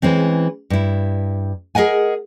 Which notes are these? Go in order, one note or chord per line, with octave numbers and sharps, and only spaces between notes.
E3 G#3 C4 C#4
G2 E4
G#4 A#4 D#5 F#5 G#5